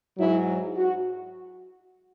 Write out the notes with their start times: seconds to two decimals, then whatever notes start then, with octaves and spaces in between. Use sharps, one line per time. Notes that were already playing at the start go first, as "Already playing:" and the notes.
0.18 G#2 F#3 E4
0.76 F#4